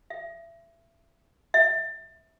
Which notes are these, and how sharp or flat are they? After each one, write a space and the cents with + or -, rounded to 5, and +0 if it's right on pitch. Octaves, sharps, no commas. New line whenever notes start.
E5 +25
E5 -10